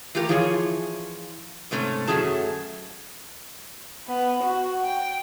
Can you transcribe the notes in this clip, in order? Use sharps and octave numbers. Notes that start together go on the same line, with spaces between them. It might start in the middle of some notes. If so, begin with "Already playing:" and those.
E3 A3 F4 G4 A#4
E3 F3 F4 G#4 C#5
G#2 C3 A3 C#4
F#2 F#3 A3 C#4 G#4 A5
B3
F#4
G5